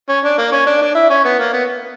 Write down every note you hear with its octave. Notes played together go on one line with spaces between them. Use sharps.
C#4
D4
A#3
C#4
D4
D4
E4
C#4
B3
A#3
B3